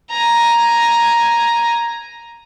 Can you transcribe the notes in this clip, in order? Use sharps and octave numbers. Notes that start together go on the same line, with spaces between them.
G#5 A#5